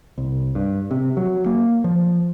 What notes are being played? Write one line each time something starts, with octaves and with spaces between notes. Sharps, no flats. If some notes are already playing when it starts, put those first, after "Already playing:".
C2
G2
C3
F#3
A#3
F3